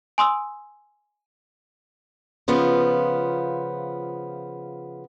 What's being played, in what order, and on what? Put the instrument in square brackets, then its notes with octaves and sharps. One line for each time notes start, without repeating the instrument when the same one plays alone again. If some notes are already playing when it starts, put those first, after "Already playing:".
[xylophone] G#5 C6 D#6 E6
[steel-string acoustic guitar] C#3 F3 B3 F4